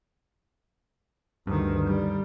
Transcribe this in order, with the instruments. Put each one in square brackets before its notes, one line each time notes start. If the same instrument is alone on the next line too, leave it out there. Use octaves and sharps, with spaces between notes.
[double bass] D2 D#3 [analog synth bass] G2
[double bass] G3